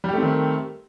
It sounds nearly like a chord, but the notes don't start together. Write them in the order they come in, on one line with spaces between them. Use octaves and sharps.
G3 G4 A3 C4 D#3